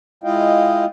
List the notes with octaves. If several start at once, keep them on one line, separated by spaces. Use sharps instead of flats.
G#3 E4 F4 D#5 F5 G5